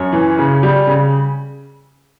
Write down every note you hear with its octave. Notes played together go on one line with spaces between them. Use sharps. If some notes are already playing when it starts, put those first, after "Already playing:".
Already playing: F#2 C#5
E3
C#3
G3
C#3